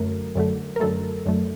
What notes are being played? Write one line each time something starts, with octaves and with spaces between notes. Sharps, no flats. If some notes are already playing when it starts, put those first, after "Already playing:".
Already playing: F#2 D3 F#3 A3 A#4
F#2 D3 F#3 A3
A#4
F#2 D3 F#3 A3 A4
F#2 D3 F#3 A3